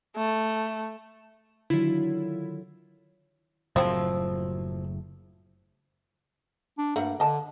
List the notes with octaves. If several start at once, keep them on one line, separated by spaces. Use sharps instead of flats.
A3
D3 D#3 F#3 E4 F4
F#1 A2 F3 F#3 C4
D4
G2 A3 A#3 F#4
D3 D#5 A5